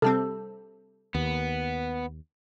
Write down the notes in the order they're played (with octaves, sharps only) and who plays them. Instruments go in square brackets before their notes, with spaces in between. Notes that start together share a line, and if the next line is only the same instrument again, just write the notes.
[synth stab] C3 G3 C4 [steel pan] A4
[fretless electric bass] D#2 [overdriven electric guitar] B3